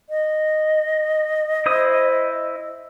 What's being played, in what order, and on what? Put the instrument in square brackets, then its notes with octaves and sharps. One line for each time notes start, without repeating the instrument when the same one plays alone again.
[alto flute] D#5
[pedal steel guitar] E4 C5 D#6